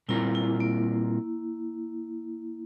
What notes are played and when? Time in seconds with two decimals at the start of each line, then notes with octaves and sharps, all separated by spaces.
0.09 A#2 G3 C4 E4 F4 A#4
0.35 E4
0.60 A#3